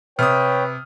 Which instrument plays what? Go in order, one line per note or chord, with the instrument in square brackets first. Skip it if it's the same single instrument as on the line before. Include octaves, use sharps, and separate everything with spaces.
[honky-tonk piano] C3 [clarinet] B4 [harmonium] C#5 G5 [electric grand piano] D#6 F6